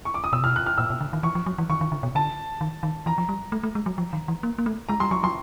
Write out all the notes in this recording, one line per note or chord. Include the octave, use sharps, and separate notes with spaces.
C#6
D6
D#6
B2 E6
C3 F6
B2
F#6
F6
A#2 E6
B2
D3
D#3
E3 C#6
F3
F#3
E3
D#3 C#6
D#3
D3
B2
D3 A5
D#3
D#3
E3 A#5
F3
G3
A3
A3
G#3
F#3
F3
D#3
E3
A#3
A#3
A3
G#3 A#5
G3 C6
F#3 C#6
F#3 C6